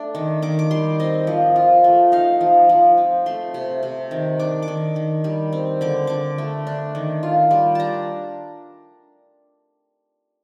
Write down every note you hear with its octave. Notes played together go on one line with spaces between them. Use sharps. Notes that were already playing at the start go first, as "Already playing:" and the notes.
Already playing: A3 D4
D#3
D#3 D6
D6
G3 C6
C4 D#5
F3
F4
A3
D#4 F5
F3
F3
C4
A3 C6
C3
C3
D#3
D4 D6
D6
D#3
D#3
G3
C4
D3 D6
D3 D6
A3
D4
D#3
F4
G3
D4 A5 A#5